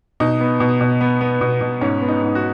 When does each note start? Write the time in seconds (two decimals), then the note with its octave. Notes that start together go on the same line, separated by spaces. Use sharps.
0.20 B2 D#4
0.41 B3
0.60 B2
0.81 B2
1.01 B3
1.21 B3
1.41 B2
1.61 B2
1.81 G#2 C#4
2.02 B3
2.08 D#4
2.22 G#2
2.35 F#4